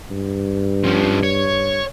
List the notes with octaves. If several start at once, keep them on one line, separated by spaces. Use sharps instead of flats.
G2
F3 C#4
C#5